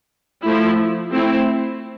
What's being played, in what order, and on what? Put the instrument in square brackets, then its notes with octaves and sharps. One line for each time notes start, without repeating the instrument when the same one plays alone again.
[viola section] F3 A3 E4
A3 C4 E4